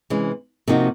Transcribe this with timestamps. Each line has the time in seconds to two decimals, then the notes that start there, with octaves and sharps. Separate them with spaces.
0.10 C3 E3 G#3 C#4
0.68 C3 F3 A#3 D#4 F#4